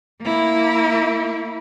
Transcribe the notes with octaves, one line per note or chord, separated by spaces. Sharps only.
A#3 E4